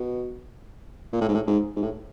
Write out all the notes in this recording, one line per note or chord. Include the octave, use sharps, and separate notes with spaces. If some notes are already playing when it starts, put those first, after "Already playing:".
Already playing: B2
A#2
A2
G#2
A2
G#2
G#2
A2